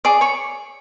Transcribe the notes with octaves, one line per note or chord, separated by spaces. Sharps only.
G#4 C#5 D5 D6
C#5 C#6